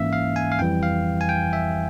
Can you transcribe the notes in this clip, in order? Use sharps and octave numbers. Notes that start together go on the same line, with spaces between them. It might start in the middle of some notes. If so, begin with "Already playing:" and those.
Already playing: G#2 E3 A#3 C#4 E5 F5
F5
G#5
F5
F2 E3 G3 G5
F5
G#5
G5
E5